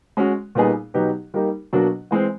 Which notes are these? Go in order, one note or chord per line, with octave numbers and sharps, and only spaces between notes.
G#3 C#4 F#4
A#2 G3 B3 D#4 G#4
B2 F#3 B3 D#4 G4
G3 A#3 D#4 G4 A#4
B2 F#3 A#3 D4 F#4
E3 G#3 C4